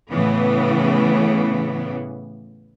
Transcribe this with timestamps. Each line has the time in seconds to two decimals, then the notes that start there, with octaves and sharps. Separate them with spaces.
0.11 A2 C#3 E3 B3